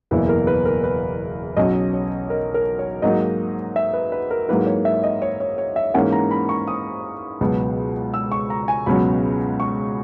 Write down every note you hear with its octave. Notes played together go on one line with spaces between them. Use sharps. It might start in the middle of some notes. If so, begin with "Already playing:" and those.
F#1 E2 B2 A#3 E4 B4
A#4
B4
A#4
B4
B1 B2 F#3 C#4 D#5
C#5
A#4
A#4
C#5
G#2 F#3 A#3 D#4 D#5
E5
B4
B4
A#4
G#2 F#3 A#3 E4 B4
C#5
E5
D#5
C#5
C#5
C#5
E5
G#2 E3 A#3 C#4 F#5
A#5
B5
C#6
D#6
C#2 B2 F#3 B3
E6
C#6
A#5
G#5
C#2 B2 F#3 C#4 B5
C#6